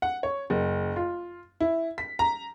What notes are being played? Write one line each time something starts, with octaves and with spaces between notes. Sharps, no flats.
F#5
C#5
F#1
F4
E4
B6
A#5